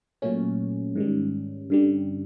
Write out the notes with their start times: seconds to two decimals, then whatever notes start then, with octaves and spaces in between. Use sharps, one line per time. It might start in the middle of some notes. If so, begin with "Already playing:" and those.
0.22 A#2 F#3 A3 C#4
0.96 G#2 D#3 G3
1.70 G2 D3 G3